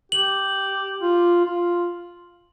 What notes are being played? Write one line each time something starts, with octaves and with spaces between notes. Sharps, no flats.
G4 F#7
F4
F4